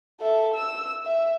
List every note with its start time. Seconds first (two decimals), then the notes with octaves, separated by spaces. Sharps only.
0.20 A4 E5
0.54 E6
1.05 E5